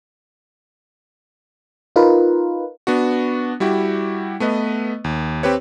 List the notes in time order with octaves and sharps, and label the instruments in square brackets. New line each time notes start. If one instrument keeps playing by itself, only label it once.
[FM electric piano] D#4 F4 A#4 B4
[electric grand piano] B3 D4 F#4
G3 E4 F#4 G4
A3 B3 B4 D#5
D#2
C4 G4 B4 C#5